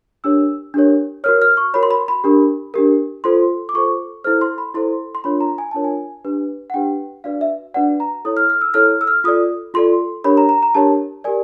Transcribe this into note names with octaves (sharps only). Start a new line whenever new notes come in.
D4 G4 A#4 C#5 E6
D4 G4 A#4 C#5
F#4 A#4 C#5 F6
F6
C#6
F#4 A#4 C#5 B5
C6
B5
B5
D4 G4 A#4
D4 G4 A#4
F4 A4 C5 C6
D6
F4 A4 C5 C#6
E4 A4 C5 F6
C6
B5
E4 A4 C5 C6
C6
D4 F4 A#4 C#5 B5
A#5
G#5
D4 F4 A#4 C#5 A5
G#5
D4 G4 B4
F#5
D4 G4 B4 G5
D4 F#4 B4 D5 F5
E5
D4 F#4 B4 D5 F#5
A#5
E4 A4 C#5 D#6
F6
F6
E6
E4 A4 C#5 F6
E6
F6
F4 A4 D5 D#6
F4 A4 D5 C6
D4 G4 A#4 C#5 B5
A#5
A#5
A#5
D4 G4 A#4 C#5 A5
G4 A#4 D5 G#5